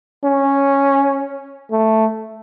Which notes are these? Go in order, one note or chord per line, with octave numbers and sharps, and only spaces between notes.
C#4
A3